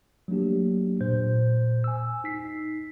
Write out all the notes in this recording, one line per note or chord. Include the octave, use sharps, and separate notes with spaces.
F#3 A3 A#3 D4 G4
A#2 C5 G6
G#5 E6
D#4 B6 C7